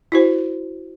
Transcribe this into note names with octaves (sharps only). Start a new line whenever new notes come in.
E4 F#4 C5